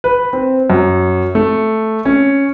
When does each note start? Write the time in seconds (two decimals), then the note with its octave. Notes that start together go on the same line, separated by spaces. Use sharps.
0.04 B4
0.33 C4
0.70 F#2
1.35 A3
2.05 C#4